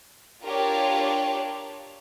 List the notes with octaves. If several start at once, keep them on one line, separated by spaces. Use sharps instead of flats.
D4 F4 G4 A#4 C#5 D5